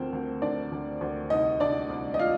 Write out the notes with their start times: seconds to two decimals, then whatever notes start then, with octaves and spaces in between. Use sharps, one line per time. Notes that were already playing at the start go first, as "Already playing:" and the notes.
Already playing: D2 F3 C4 A#4 C5
0.13 D2
0.42 D2 D4 D5
0.72 D2
1.01 D2
1.30 C2 D#4 D#5
1.60 C2 D4 D5
1.90 C2
2.14 D#5
2.19 F4 F5